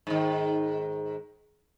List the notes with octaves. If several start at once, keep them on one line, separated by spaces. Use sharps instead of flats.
G#2 D#3